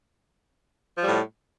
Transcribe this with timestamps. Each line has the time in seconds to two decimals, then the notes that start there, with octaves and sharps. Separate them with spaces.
0.98 F3
1.02 G3
1.06 A2